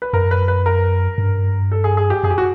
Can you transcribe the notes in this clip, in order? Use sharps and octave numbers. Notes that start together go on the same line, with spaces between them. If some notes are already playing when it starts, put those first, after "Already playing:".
B4
F#2 A#4
B4
B4
A#4
G2
A4
G#4
G#4
G4
F#2 G#4
G4
F#4